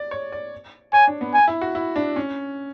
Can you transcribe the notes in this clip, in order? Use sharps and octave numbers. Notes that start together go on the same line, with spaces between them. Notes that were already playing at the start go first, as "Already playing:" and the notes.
Already playing: D5
C#5
D5
C#5 G#5
D4
B3
G#5
E4
F#4
E4
D4
C#4